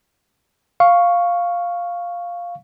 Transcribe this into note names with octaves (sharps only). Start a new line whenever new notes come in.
F5 C#6